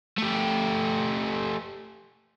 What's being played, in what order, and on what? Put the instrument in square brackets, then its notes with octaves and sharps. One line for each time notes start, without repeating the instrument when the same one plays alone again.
[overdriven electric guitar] A3 G4